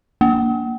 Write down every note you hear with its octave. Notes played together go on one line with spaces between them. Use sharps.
A#3